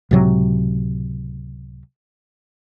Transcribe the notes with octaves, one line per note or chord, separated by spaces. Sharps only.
C#2 A2 C3 F#3